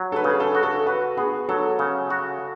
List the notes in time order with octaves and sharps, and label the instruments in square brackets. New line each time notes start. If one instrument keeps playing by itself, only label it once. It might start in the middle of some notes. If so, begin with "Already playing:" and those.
Already playing: [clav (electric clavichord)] F#3
[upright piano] A4
B4
[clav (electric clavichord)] C#3
[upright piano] G#4
A4
[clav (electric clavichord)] F#4
[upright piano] A4
[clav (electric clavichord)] F#4 [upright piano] B4
[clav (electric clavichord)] B3 [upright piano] G#4
[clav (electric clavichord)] F#3 [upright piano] A4
[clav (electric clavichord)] C#3
F#4